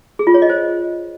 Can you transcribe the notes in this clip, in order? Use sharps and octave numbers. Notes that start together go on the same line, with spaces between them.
G#4
F4
C#5
D#5
C5